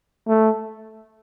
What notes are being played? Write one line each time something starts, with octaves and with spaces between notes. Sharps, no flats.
A3